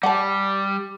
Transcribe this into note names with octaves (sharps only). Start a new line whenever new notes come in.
G3 F#5 A5